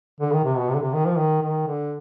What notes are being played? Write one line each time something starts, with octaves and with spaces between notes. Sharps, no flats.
D3
D#3
C3
B2
C3
D3
C3
D#3
F3
D#3
D#3
D3